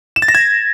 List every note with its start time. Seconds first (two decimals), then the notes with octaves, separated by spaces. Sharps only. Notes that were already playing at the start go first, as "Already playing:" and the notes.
0.16 E7
0.22 A6
0.28 A#6
0.35 G#6